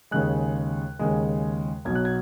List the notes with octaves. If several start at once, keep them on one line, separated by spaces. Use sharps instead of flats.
D#2 C#3 G#3 F#6
D#2 C#3 G#3
B1 B2 F#3 G#6
F#6
G#6